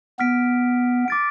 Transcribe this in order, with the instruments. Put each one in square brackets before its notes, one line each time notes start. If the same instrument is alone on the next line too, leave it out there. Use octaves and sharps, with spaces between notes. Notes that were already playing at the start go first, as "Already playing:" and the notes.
[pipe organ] B3 [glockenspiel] F6 B6 D7
[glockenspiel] D6 A6 D7